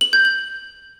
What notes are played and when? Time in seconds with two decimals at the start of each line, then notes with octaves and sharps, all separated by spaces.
0.01 F#7
0.13 G6
0.25 F#7